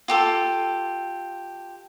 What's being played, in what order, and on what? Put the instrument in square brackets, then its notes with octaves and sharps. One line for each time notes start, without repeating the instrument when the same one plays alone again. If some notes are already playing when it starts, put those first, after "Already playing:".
[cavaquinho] F4 G4 A4